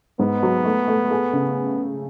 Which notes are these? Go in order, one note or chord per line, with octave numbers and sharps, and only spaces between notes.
G#2 B3
F#3
A3
A3
G#4
C#3